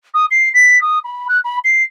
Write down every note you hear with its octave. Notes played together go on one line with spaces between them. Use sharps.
D#6
C7
B6
D#6
B5
F#6
B5
C7